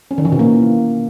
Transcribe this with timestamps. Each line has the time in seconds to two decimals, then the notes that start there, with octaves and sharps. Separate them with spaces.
0.11 C#4
0.18 D#3
0.25 E3
0.32 B2
0.39 A#3